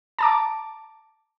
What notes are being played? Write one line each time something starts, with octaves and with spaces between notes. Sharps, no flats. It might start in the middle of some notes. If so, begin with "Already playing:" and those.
A5 A#5 D6